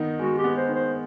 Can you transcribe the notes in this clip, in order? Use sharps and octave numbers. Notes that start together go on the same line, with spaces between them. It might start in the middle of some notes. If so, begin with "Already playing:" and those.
Already playing: D#3 B3 D#4
G#3 F#4
G4
B3
C5
D#3
C5